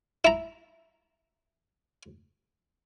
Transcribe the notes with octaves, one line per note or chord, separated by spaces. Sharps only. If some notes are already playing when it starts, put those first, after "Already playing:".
E4 A#5